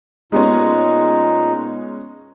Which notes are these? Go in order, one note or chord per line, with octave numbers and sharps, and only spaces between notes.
A#2 G#3 B3 C#4 D#4